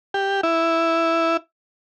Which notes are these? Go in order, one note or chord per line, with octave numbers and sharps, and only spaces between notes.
G4
E4